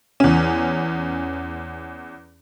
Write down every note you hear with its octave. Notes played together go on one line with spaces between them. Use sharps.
E2 C#4